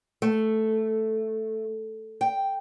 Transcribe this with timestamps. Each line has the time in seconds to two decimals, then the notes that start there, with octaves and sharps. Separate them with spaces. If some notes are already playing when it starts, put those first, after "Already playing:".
0.22 A3
2.21 G5